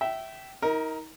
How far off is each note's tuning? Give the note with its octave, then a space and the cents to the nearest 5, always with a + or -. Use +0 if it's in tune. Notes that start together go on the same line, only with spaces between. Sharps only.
E5 +0 G5 -25
D#4 +35 A#4 +0